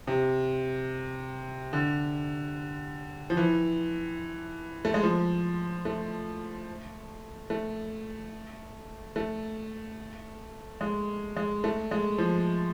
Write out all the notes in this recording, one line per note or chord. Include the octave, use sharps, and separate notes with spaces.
C3
D3
F3
E3
A3
G#3
F3
A3
A3
A3
G#3
G#3
A3
G#3
F3